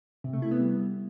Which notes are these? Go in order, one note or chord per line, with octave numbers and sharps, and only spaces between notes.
C3
A3
E4
B3
G3